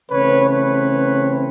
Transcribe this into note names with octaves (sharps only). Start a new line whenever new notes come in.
C#3 E3 A3 C4 B4 C#5
B4 C#5